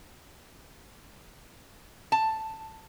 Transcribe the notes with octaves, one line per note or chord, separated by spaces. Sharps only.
A5